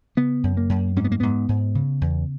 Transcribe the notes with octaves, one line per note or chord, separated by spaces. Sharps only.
C#3 B3
F#2
A#3
F#2
G#2 C#4
B3
A#3
G#2 B3
G#2
C#3
E2